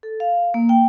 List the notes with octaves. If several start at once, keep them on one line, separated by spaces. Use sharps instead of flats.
A4
F5
A#3
G5